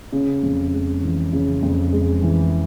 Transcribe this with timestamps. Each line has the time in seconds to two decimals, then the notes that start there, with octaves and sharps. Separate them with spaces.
0.12 C#3
0.43 F2
0.73 G#3
1.03 E3
1.33 C#3
1.63 F2
1.93 G#3
2.23 E3